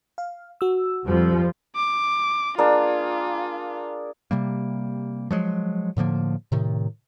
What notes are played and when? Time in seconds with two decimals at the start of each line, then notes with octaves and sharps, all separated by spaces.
0.18 F5
0.61 F#4 E6
1.06 F2 F3 G3
1.76 D6
2.58 A#3 D4 F4 G#4
4.31 C3 G3 A#3
5.31 F3 F#3 G#3
5.97 A2 D3 F3 A#3
6.52 A2 C3 D#3